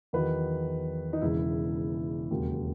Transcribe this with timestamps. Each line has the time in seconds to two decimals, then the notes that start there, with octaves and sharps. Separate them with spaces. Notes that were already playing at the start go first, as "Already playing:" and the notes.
0.13 E2 D#3 F#3 B4
1.13 D#4
1.22 E1 E2 C#3 E3 E4
2.31 E1 D#2 C#3 F#3